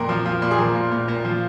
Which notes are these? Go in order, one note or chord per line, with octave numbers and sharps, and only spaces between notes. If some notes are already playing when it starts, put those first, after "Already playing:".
Already playing: F2 A#2 A#4
F3
F3
A#2
G#4
F3 A#4
A#2
A#2
A#2
F3